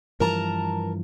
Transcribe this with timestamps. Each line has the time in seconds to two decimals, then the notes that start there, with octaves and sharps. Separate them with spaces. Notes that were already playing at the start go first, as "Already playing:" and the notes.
0.20 G2 E3 F3 A#4 A5 A#5